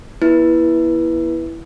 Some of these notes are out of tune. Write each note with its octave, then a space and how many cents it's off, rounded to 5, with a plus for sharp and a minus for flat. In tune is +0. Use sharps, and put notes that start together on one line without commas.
B3 -45 E4 +0 B4 -15